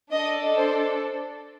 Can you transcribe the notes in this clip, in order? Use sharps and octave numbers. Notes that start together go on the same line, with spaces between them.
D4 A4 D#5
C5